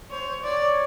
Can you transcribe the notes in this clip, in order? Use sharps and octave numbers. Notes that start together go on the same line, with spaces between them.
C5 C#5
C#5 D5